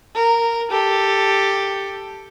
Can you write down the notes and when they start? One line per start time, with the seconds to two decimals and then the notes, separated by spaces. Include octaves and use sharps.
0.15 A#4
0.71 G4 A4